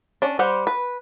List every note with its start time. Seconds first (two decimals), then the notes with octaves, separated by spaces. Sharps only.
0.22 C#4 D4
0.39 G3 G4 C5 F#5
0.67 B4